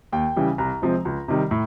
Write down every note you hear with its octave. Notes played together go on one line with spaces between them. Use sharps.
D#2 G5
C#3 E3 G3
C2 A#5
C3 F3 G#3 C4
C#2
C3 D#3 G3
A2